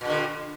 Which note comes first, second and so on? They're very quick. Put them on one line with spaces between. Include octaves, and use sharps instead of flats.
A#2 G2 D3